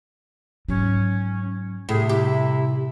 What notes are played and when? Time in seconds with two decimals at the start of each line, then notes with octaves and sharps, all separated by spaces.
0.68 G#2 F#3 C#4
1.89 A2 C3 G3 G#4
2.09 E4 G4